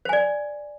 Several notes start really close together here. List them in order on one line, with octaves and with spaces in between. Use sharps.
C5 G#5 D5